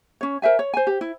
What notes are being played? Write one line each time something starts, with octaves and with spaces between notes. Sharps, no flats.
C#4 C#5
A#4 C5 E5 G#5
C#5
C5 G#5
G4
E4